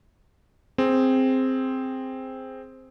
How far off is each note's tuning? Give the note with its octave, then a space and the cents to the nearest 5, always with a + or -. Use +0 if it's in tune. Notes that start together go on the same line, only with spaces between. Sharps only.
C4 +0 G#4 +0